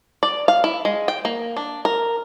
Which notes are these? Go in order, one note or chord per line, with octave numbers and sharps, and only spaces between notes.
D5
F5
E4
G#3
G5
A#3
D4
A#4